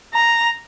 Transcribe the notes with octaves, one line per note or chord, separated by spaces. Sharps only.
A#5